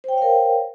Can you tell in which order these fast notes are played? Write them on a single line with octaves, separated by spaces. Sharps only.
C5 G5 C#5 F5 A#4